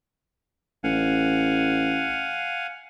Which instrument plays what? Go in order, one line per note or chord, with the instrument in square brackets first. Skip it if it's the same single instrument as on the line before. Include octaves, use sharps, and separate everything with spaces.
[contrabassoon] A1 [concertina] F5 F#5 G#5